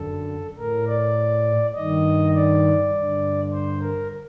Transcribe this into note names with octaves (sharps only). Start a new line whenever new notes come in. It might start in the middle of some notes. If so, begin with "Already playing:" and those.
Already playing: F#2 D3 A4
A2 A#4
D5
G2 D#3 D#5
D5
G2 D3
C5
A#4